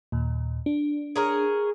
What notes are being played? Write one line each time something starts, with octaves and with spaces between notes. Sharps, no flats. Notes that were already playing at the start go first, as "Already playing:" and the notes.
D#2 A#2
D4
G#4 A#4 C#5